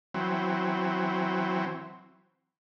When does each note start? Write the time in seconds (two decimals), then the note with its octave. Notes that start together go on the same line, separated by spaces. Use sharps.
0.14 E3 F#3 C4